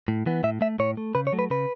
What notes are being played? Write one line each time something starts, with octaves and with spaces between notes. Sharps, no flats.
A2
E3 B3
A2 E5
A3 E5
A2 C#5
A3
C#3 B4
C#5
F#3 A3
B4
C#3 B4